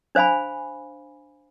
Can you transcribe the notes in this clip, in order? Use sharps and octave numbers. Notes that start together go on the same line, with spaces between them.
D4 C5 F5 G#5 B5